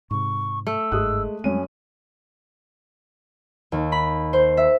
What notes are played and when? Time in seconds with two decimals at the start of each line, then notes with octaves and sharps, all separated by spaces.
0.11 G#2 C3 C#6
0.67 A3 E6
0.92 G1 G#2 G#3 D#6 F#6
1.44 F#2 G3 G#3 C4 C#4 G#5 D#7
3.72 D#2
3.92 B5
4.33 C5
4.57 E5